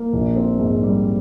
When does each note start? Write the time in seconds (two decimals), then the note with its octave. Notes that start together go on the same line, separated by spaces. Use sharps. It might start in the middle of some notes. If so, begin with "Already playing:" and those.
Already playing: A#3
0.13 A#1
0.36 C4
0.59 G#2
0.83 G3